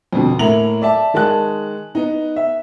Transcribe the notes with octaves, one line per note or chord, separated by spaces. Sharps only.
F2 B2 D3
A2 A3 A#3 A#5 F7 F#7
D5 E5 A5
D#3 G#3 A5 F#6
B3 D#4
E5